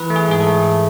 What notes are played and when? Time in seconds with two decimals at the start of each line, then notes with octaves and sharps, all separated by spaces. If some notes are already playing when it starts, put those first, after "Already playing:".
Already playing: E3 B4
0.10 A3
0.16 G#4
0.28 G#2 G#4
0.40 A4
0.46 A3